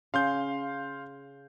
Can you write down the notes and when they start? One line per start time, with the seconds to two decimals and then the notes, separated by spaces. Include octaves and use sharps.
0.14 C#3 F5 C6 G6